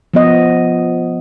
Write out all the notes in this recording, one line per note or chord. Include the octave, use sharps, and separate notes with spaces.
F3 B3 D#5